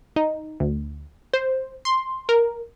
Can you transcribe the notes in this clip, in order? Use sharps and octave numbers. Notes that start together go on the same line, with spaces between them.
D#4
D2
C5
C6
A#4